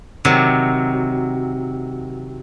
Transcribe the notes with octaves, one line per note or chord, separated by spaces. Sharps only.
C3 D#3 F#3